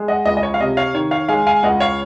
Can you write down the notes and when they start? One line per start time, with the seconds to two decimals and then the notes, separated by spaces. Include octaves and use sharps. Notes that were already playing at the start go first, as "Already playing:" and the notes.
Already playing: G#3
0.08 D#5 F#5
0.26 C#2 D#5
0.37 D#5
0.43 C#5
0.54 F5
0.60 C3 D#5
0.77 C#5 F5
0.94 D#3 C#5
1.11 C#5 F5
1.28 G#3 F5 G#5
1.47 F5 G#5
1.63 C#2 D#5 F#5
1.80 C#5 F5